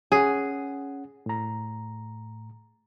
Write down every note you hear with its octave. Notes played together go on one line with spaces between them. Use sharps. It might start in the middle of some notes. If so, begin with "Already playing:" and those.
C#4 G#4 F#5
A2 A#5